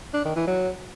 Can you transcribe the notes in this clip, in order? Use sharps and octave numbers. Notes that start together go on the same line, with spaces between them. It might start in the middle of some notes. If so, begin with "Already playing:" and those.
D4
D#3
E3
F#3